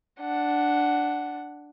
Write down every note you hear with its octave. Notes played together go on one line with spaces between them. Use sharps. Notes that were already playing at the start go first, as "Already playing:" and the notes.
D4 F#5